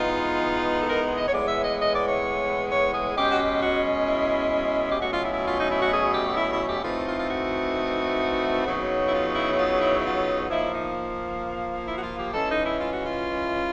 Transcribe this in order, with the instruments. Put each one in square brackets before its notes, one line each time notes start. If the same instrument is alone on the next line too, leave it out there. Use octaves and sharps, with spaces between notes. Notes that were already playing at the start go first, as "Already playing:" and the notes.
Already playing: [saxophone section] E3 G#3 B3 D#4 F4
A4
A#4
D#5
C#5
A2 E3 G#3 B3 D5
E5
D#5
D#5
D5
C#5
C#5
G#4
B2 G#3 C#4 G4
F#4
G4
F#4
E4
G4
B2 F#3 A3 C#4 F#4
F4
E4
E4
F4
D#4
E4
F#4
G#4
G4
E4
E4
G4
E3 A3 C4 D#4 F4
F4
F4
F#4
C#3 F#3 B3 D#4
E4
F4
E4
E4
F4
E4
E4
F4
F3 A#3 D#4 E4
D#4
E4
F#4
F4
G4
E3 G#3 C#4 A4
D#4
E4
F4
F#4
F4